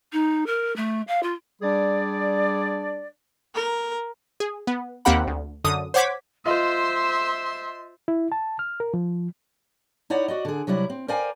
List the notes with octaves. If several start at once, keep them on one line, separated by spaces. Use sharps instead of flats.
D#4
A#4
A3
F5
F4
G3 D4 G#4 D5
A#4
G#4
B3
D#2 A#3 C4 G4 F#5 B5
D2
F#2 D3 D#6
C5 C#5 F#5 D6 G#6 B6
F4 C5 D#5 E5 C6
E4
A5
F6
A#4
F3
D#4 E4 C#5 D5 F#5
F#4 D5 D#5
D3 G#4
C3 F#3 G3 E4
C4
A#4 C5 D5 F5 G5 G#5